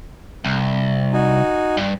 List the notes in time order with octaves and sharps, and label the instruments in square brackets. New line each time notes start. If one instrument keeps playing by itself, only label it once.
[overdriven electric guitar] C2
[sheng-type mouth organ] D#4 F#4 G#5
[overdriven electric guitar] G2